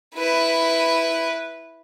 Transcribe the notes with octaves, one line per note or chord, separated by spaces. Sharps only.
E4 B4